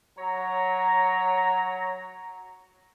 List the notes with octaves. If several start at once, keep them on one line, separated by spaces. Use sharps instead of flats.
F#3 C#5 A#5